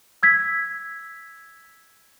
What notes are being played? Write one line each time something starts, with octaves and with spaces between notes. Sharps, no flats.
E6 G#6 B6